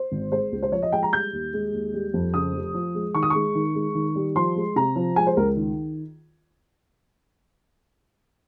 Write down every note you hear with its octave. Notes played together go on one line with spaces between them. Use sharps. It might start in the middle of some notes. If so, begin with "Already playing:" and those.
Already playing: C5
G#1
G#3 C5
C#2
C5
F3 C#5
D#5
G#3 G5
A#5
G3 G6
D#2
G#3
D#2
G3
F2
C#3 D#6
F1
F3
G#3
D#3 C#6
D#6
G#3 C#6
D#3
G#3
D#3
G3
F3 C6
G#3
C3 A#5
F3
G#3 G#5
C5
C#2 A#4
D#3